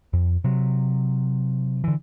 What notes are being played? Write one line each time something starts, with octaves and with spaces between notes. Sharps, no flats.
F2
C3 F#3
D3 E3